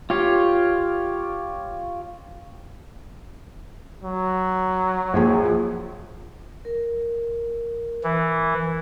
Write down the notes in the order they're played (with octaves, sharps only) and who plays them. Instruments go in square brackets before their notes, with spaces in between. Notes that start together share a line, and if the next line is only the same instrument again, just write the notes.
[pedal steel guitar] F4 G4 C#5 F5
[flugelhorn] F#3
[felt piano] A#1 F3 G#4
[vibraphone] A#4
[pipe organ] E3